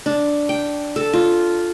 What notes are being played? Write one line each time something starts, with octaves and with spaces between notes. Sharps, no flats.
D4
G5
A4
F4